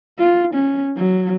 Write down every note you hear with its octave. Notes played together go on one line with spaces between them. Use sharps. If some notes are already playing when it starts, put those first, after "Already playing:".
F4
C#4
F#3